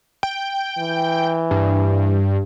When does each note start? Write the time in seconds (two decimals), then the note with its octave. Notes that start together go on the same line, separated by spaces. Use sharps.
0.23 G5
0.78 E3
1.51 G2